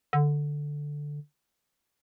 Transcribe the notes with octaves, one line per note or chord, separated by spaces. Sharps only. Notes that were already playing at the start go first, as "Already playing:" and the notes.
D3